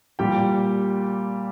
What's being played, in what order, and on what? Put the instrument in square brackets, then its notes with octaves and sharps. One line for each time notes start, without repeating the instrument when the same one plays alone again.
[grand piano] A#2 G3 G4 G5